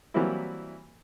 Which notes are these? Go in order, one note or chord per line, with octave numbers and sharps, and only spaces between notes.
E3 F#3 G3 A#3 C4 E4